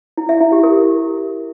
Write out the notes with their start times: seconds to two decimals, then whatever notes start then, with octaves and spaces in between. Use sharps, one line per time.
0.17 E4
0.29 E5
0.40 E4
0.52 G4
0.63 A#4